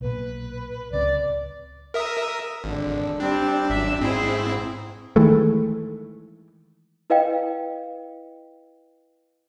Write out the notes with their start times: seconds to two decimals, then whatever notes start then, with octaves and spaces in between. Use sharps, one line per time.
0.01 B1 A#2 B4
0.91 D1 C#2 C4 D5
1.94 A#4 E5 D#6
2.64 G#1 D3
3.20 G3 C4 D4
3.70 G#1 F#2 E5
4.01 G#2 C4 E4 G#4
5.16 D#3 E3 G#3 A3
7.10 E4 B4 D#5 F5 G5